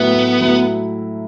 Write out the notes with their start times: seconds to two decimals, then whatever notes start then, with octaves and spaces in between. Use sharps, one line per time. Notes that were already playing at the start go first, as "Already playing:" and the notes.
Already playing: A2 F#3 A3 B3 E4
0.15 A2
0.40 F#3 A3 E4